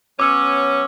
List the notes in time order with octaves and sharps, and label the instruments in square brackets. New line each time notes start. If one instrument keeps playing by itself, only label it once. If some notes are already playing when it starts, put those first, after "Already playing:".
[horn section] F#3 B3 C#4 [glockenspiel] D6 E6